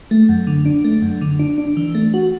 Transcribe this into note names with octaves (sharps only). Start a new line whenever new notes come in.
A3
F#2
D3
D4
A3
F#2
D3
D4
D4
E3
A3
F#4